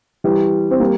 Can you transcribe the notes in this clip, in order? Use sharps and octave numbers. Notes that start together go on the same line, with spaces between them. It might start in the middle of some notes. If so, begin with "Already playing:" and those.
E3 G3
C4
G3 A#3